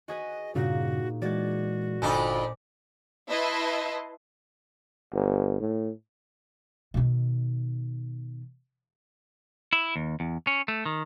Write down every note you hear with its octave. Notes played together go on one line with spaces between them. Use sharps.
F#4 G#4 B4 D#5
G2 A#2 C#3 D#4 F#4
E3 G#3 F#4 D5 G#6
G1 F2 D4 D#4 G#5 D6
E4 B4 D#5 E5 A5 C6
G1
A2
B2 D#3
E4
D#2
E2
C#4
A3
D#3